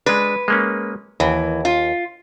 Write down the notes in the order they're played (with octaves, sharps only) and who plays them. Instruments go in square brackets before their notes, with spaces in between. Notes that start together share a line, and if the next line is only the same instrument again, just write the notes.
[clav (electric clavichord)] G#3 D4 [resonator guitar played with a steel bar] B4
[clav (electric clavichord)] G#3 A#3 C#4
[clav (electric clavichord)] D#2 [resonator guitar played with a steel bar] E3
[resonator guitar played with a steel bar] F4